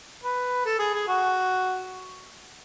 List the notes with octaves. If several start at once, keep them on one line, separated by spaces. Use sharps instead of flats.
B4
A4
G#4
G#4
F#4